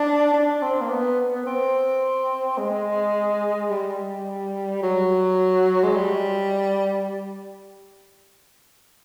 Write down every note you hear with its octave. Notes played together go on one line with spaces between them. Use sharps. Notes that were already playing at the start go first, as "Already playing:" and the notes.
Already playing: D4
D4
C4
A#3
B3
B3
C4
G#3
G3
F#3
G#3
G3